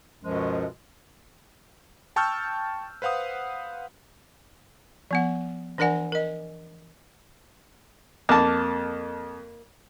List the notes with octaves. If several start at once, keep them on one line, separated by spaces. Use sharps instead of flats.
C#2 F#2 B2 F3 G#3
G5 A5 C#6 E6 F6 G6
B4 C5 F5 F#5 D#6
F3 B3 F#5
E3 D4 A#4 D5 F#5 G#5
A#4 D#5
F2 A#3 A5